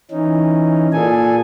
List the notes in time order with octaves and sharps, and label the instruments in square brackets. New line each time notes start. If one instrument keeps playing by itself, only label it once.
[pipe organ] E3 C#4 D#4
[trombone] A#2 [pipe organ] G#4 A4 G#5